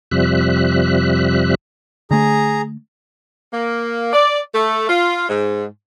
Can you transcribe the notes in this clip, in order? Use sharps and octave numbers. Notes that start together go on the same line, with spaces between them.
F2 C3 F3 G3 E5 F#6
D3 A3 G#4 A#5
A#3
D5
A3
F4
G#2